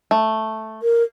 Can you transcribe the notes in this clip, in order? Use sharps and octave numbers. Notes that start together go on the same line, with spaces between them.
A3
A#4